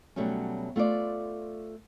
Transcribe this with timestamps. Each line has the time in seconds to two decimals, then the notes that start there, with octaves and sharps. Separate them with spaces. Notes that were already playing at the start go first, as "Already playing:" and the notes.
0.16 B2 F#3 G3 A3 C#4
0.76 A3 F4 C5 D5